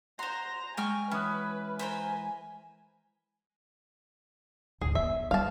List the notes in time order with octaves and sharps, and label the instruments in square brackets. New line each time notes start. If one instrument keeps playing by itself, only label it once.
[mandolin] C5 C6 [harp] F#5 [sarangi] A#5
[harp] G#3 [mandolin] G5 C#6 F6 [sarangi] G#5
[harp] E3 D#6 F#6 [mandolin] C#4 [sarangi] B4
[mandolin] A#4 C5 B5 [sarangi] G#5
[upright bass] D2 G#2 [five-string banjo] G#4
[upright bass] D#3 B3 [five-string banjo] E5
[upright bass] G3 [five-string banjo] F5 A5